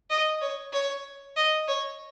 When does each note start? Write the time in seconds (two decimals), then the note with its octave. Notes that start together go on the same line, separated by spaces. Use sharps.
0.10 D#5
0.41 C#5
0.73 C#5
1.36 D#5
1.68 C#5